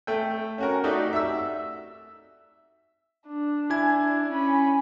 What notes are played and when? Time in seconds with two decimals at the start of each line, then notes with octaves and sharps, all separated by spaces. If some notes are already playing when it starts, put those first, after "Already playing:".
0.07 A3 G5
0.58 C#4 F#4 A#4
0.84 A3 D#4 F#4 G4 D5
1.13 E5 E6
3.27 D4
3.70 E4 G#5 G#6
4.29 C#4 B5